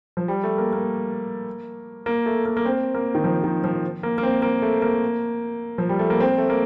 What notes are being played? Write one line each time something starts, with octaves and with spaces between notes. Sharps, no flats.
F3
G3
A3
A#3
A#3
A#3
A3
A#3
A#3
C4
A#3
D#3
F3
D#3
F3
A#3
A#3
C4
A#3
A3
A#3
F3
G3
A3
A#3
C4
A3
A#3